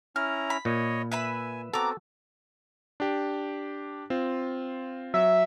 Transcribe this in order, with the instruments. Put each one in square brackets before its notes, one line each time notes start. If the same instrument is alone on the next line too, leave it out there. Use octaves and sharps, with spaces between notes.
[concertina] C#4 E4 A#5 [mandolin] F6
[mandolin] B5
[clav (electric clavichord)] A#2 [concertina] C#5 D#5
[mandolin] B4 E5 B5 [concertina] G#5
[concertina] B3 C4 F#4 [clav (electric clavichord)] A4 [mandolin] A#5 D6
[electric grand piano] D4 G4
C4 F4
[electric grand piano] F#3 [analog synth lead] E5